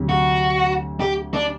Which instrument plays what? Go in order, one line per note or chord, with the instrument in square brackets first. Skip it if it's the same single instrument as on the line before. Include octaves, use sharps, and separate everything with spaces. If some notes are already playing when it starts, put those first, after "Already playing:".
Already playing: [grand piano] D2 C3 F#3
[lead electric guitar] F#4
G4
D4